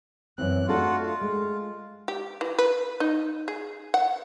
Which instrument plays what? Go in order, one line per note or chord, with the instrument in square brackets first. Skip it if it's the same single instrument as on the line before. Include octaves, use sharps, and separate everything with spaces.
[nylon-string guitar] F#2 E3 C4 [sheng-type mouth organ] F#6
[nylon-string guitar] A3 D4 A4 [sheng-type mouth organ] F4 F#4
[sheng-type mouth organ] F4
[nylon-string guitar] G#3
[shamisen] G4
E3
B4
D#4
G#4
F#5